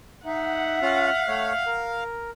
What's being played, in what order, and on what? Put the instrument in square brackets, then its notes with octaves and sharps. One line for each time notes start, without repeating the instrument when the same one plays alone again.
[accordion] D#4 [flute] E5 [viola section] F#5
[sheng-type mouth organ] C#4 F4 [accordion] F5
[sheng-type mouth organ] A3 C#5
A#4